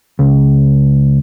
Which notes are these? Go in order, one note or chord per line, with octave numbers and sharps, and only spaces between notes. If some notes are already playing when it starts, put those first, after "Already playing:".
C#2